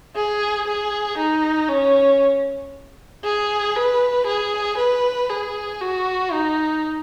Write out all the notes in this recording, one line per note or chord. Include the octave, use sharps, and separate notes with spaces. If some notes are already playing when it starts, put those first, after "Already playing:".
G#4
G#4
D#4
C#4
G#4
B4
G#4
B4
G#4
F#4
D#4